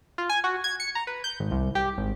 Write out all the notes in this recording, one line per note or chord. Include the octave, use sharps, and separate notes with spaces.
F4
G#5
F#4
G#6
C#7
A#5
B4
G6
G#1
C2
G4
G#1